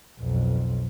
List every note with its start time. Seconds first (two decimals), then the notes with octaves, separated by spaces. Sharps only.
0.20 B1 F2